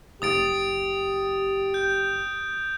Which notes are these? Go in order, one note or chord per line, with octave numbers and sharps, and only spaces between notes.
F#1 G4 D#6 A6 D7
G6